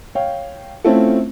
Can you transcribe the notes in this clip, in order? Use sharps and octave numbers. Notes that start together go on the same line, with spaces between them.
C#5 F5 G5
A3 C4 C#4 E4 F4 A4